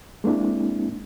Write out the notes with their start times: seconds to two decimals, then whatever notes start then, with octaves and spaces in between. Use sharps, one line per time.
0.24 G#3 A#3 C4 D4 E4